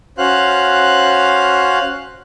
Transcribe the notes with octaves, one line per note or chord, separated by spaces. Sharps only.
C#4 F#4 C5 F5 F#6